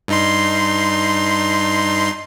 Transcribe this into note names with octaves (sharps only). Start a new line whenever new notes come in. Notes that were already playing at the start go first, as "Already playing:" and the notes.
G2 D#4 C6